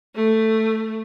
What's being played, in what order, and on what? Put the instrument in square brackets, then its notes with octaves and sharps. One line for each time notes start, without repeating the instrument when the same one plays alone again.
[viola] A3